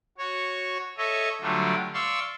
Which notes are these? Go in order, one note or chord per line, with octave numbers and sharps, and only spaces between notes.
F#4 C#5
A4 C#5 D#5 E5
D3 F#3 G3 A3 D4 F4
D5 F5 C6 C#6 E6